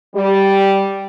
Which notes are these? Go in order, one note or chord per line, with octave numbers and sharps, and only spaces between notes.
G3